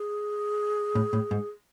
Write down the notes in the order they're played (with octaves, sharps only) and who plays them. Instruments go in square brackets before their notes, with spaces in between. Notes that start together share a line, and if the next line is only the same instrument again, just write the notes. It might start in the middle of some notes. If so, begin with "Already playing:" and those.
Already playing: [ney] G#4
[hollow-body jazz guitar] A2
A2
G#2